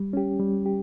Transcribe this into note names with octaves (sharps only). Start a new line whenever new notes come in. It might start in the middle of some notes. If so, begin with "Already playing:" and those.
Already playing: G3
C#4 G4
G3
G4